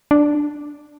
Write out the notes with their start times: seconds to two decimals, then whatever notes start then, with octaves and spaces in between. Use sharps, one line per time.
0.11 D4